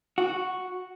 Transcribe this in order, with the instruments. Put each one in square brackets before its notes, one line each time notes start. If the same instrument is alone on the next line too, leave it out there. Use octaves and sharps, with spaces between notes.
[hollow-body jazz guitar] F#4